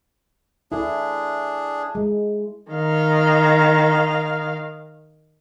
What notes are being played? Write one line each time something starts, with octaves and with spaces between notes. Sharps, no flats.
D4 E4 G#4 A4
G#3
D#3 F5